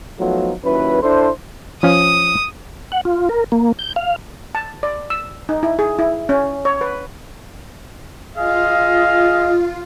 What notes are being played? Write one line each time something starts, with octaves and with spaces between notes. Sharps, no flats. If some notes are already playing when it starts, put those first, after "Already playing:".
F3 F#3 A3 B3 D#4 F4
D#2 F#3 C#4 E4 B4
D4 E4 A4 C5
F3 C#4 F5 D#6
F#5
F4
A#4
A#3
G6
F5
A5
D5
E6
D#4
E4
G#4
E4
C#4
C#5
B4
F4 G#4 D#5 F5